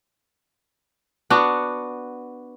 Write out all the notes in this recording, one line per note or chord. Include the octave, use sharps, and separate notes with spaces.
B3 D4 F#4